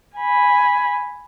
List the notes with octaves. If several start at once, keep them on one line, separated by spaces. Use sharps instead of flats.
G#5 B5